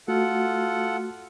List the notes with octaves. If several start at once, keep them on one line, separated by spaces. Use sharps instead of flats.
A3 F4 F#4 A4 F#5